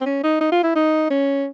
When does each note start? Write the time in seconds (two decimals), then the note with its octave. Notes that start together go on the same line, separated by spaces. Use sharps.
0.01 C4
0.06 C#4
0.23 D#4
0.41 D#4
0.52 F4
0.63 E4
0.76 D#4
1.10 C#4